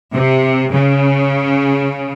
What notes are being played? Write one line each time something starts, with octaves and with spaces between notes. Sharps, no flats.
C3
C#3